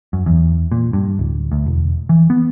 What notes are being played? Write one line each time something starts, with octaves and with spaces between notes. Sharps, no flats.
F#2
E2
A#2
G2
D1
D2
E1
E3
B3